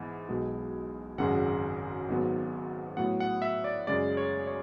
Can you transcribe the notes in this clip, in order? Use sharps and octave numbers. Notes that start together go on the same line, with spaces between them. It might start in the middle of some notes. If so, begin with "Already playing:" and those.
Already playing: G#2 E3 B3
B1 B2 G#3
G#1 F#2 C#3 G#3 F#5
G#1 G#2 F#3 B3
A2 F#3 B3 F#5
F#5
E5
D5
F#2 C#3 G#3 D5
C#5
C#5